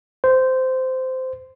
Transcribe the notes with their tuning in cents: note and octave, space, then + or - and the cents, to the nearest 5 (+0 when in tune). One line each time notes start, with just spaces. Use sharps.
C5 -15